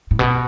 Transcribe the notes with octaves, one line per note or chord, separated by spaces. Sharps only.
A2
B2